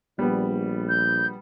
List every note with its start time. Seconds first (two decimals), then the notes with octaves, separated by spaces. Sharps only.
0.19 A#1 G3 B3
0.89 G6